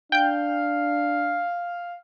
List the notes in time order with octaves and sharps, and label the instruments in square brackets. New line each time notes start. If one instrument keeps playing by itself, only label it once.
[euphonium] D4 [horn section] F5 [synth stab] G5 G6